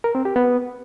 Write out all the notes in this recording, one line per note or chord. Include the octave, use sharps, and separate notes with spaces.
A#4
C4
G4
B3